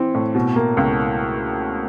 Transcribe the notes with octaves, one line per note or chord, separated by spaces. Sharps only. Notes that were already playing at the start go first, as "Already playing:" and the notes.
Already playing: E3 C4
A2
B2
A#3
C#2